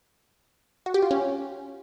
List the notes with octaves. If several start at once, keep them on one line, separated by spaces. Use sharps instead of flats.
F#4
G4
F4
C#4